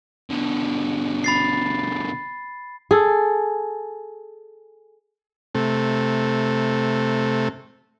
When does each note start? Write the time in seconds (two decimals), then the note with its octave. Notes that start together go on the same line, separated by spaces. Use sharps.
0.30 B2 D3
1.24 B5 A6 C7
2.91 G#4 A4
5.55 C3 A3